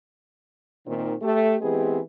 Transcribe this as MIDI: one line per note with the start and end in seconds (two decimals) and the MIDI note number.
0.87 1.14 46
0.87 1.14 51
0.87 1.14 60
1.22 1.56 57
1.22 1.56 67
1.61 1.99 52
1.61 1.99 56
1.61 1.99 59
1.61 1.99 60
1.61 1.99 67
1.61 1.99 68